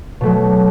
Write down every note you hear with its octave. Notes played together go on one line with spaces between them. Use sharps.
B2 F#3 A3